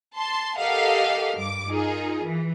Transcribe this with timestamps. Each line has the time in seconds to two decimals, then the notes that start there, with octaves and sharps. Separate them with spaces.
0.18 A5 C6
0.57 G4 A4 A#4 D#5 F5 F#5
1.38 G2 D6
1.69 D#4 F4 G#4 A#4
2.22 E3